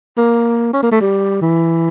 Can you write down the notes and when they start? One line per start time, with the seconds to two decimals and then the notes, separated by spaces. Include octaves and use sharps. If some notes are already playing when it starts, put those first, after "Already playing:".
0.17 A#3
0.73 C#4
0.83 A#3
0.92 A3
1.01 G3
1.42 E3